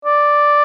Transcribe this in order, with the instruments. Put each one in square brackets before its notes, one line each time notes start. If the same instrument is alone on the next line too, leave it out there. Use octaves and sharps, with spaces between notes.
[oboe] D5